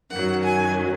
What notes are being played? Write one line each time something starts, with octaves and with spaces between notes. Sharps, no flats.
F#2 D#3 F#3 F#5
G#5